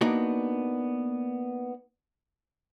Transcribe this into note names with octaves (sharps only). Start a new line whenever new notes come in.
A#3 B3 D4 D#4 F#4